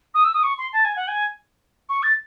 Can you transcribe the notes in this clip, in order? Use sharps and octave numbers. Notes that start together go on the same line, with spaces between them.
D#6
E6
D#6
C#6
C6
A5
G#5
F#5
G#5
C#6
A6